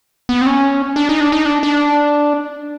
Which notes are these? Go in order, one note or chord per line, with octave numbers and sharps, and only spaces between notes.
B3
C4
C#4
D4
D#4
D4
D#4
D4
D4